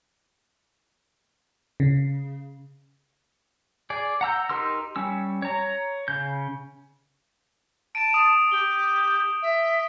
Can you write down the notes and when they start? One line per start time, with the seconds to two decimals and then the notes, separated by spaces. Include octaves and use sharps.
1.80 C#3
3.90 G#4 D5
4.21 F#5 A#5 E6 G6
4.49 D#4 G4 A#4 C6 E6
4.96 G3 C#4 E6
5.42 C#5 A#5
6.08 C#3 G6
7.95 A5 D7 D#7
8.14 D#6 D#7 E7
8.51 G4 G7
9.42 E5